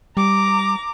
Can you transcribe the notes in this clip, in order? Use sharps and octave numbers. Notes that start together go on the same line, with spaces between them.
G3 A#5 D6